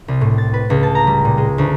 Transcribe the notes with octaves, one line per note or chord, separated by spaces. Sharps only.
C2
A2
A6
B4
C#2
A5
A#5
G3
A#2
G#3
D2